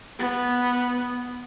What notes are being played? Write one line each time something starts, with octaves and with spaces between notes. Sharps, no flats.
B3